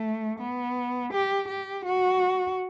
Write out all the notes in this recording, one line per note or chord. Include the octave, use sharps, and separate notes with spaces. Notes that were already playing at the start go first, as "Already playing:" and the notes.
Already playing: A3
B3
G4
G4
F#4